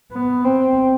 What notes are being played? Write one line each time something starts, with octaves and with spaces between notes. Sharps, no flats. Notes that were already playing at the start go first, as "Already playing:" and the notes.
B3
C4